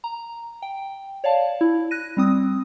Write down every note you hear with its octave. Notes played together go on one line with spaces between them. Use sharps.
A#5
G5
C#5 D5 F5 A5
E4
F#6 A#6 D#7
G3 C4 D#6